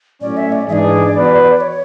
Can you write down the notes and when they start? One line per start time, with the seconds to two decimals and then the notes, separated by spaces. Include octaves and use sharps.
0.21 A2 F#3 C#4 D5
0.37 E5
0.52 D5
0.68 G#2 E3 G#3 D4 G#4 D5 E5
1.15 E3 B3 F#4 B4
1.61 C#5